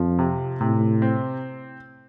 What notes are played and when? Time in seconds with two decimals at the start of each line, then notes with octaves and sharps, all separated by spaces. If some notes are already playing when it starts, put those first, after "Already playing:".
Already playing: F2 F3
0.19 C3
0.61 A2 C3
1.02 C4